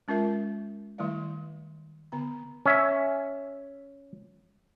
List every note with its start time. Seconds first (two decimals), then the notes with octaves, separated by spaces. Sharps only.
0.08 G#3 C#4 F4 A#4 E5
0.98 D#3 G3 A3 E4 D5 F5
2.12 D3 B3 A#5
2.66 C#4 E5